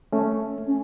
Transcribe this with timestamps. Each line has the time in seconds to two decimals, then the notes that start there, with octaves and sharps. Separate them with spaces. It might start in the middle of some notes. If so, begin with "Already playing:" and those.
0.13 A3 C#4
0.67 C#4